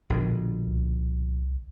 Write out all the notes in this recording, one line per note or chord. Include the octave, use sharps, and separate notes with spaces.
A#1 B2 D3
C2